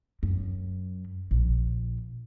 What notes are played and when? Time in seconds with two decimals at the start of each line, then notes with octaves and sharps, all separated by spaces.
0.23 F#2
1.31 A#1